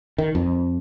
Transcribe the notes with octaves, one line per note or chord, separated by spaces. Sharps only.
D#3
F2